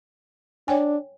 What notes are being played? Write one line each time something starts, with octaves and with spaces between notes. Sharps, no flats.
D4 C#5 G5 G#5